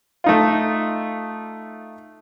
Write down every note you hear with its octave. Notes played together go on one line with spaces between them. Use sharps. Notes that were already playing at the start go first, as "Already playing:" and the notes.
A3 D#4 F4